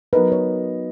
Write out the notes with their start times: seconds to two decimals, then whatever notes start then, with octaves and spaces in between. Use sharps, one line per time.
0.13 F#3 B3 D#4 A#4 B4
0.32 C#5